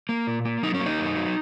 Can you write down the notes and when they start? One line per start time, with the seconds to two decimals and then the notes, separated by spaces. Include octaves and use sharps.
0.09 A#3
0.27 A#2
0.45 A#3
0.63 F#3 D#4
0.74 C#4
0.80 A#3
0.86 D#4
0.99 F#2
1.16 F#3